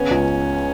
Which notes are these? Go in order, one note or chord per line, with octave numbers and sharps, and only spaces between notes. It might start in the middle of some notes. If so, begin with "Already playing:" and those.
Already playing: C#3 B3 C#4
C#2